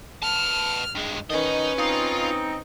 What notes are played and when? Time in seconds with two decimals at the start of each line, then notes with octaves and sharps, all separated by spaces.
0.23 B3 A5 F6
0.95 G2 G#3
1.30 D#3 C#4 D#4 B4 D#5
1.79 C4 D#4 F4